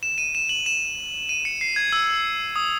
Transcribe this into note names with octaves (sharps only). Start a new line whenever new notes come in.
E7
D#7
E7
F#7
E7
D#7
C#7
C7
G#6
E6
D#6